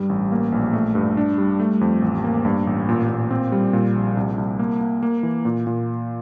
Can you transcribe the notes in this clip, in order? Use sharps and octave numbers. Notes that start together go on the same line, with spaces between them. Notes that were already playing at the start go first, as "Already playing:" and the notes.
Already playing: G2 G3
A1
A#3
A#1
A3
G2
D4
G3
A3
F2
A1
A#3
G2
A1
A#2
A#2
C4
G3
A#2
A#1
C2
C2
A#3
A#3
A#3
E3
A#2
A#2